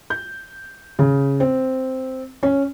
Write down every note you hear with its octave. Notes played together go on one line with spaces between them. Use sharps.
G6
C#3
C4
C#4